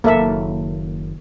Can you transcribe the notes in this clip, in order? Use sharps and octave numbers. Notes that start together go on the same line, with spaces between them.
F#1 D#3 A#3 A4 E5